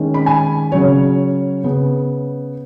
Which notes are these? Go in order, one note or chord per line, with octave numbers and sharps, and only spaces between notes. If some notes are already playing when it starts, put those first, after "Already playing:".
Already playing: D#3 G#3 C#4
B5
G#5
C#3 F#3 C#4 C#5
C#3 B3